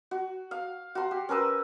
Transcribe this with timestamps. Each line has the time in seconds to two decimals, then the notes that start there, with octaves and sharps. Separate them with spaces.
0.11 F#4
0.51 F5
0.95 F#4 C6
1.11 G4
1.29 C#4 A#4 B4 E6